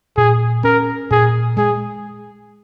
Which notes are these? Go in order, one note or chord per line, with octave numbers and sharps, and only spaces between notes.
A#2 G#4
C#4 A#4
A#2 G#4
G#3 G#4